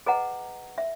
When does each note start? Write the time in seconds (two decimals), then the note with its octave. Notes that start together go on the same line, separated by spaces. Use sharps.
0.06 G#4 B4 D#5 F#5 A#5
0.78 E5